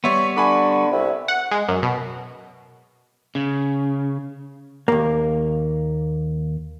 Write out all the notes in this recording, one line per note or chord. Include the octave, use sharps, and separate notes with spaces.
G3 B3 C#5 E5 C6 C#6
D3 G#5 B5 D6
C2 E5
F#5
G#3
F#2
B2
C#3
D#2 A#3